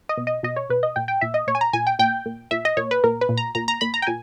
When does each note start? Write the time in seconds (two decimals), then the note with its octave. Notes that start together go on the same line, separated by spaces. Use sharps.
0.09 D#5
0.17 B2
0.27 D#5
0.43 B2 D#5
0.56 C#5
0.70 B2 B4
0.83 D#5
0.96 A#2 G5
1.08 G5
1.21 A#2 E5
1.34 D#5
1.47 A#2 C#5
1.55 G#5
1.61 A#5
1.73 A#2 G#5
1.87 G5
1.99 A#2 G5
2.26 A#2
2.51 A#2 E5
2.65 D#5
2.77 A#2 C#5
2.91 B4
3.04 A#2 A#4
3.21 B4
3.29 A#2
3.37 A#5
3.55 A#2 A#5
3.68 A#5
3.81 A#2 B5
3.94 A#5
4.02 G5
4.07 A#2 G#5